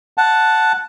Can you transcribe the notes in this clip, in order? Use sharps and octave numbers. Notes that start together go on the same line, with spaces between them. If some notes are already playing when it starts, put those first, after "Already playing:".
F#5 A5